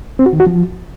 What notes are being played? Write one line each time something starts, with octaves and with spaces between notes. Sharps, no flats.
C4
F#4
D#3
F#4
F3